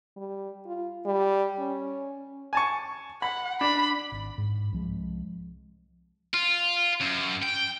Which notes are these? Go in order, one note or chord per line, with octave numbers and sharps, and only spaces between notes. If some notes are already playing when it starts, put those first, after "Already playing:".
G3
F4
G3
C#4
G#5 A5 C#6
F#5 B5
D4 B5
G#1
G#2
C2 F3 G#3
F4
F#2
G5